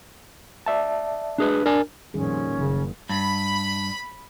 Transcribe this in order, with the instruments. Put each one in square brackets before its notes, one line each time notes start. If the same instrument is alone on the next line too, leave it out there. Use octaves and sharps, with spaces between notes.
[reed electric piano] D5 E5 A5
[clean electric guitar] D4 G#4 B4
[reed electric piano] D4 [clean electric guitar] A#4 G#5
[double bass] F2 A#2 [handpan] D#3 G3 G#4 [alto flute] C#4
[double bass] F#1 [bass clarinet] C#3
[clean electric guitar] G2 [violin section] B5